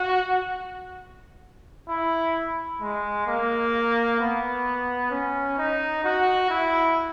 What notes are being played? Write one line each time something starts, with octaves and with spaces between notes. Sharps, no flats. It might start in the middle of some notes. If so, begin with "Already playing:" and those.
Already playing: F#4
E4
G#3
A#3
B3
C#4
D#4
F#4
E4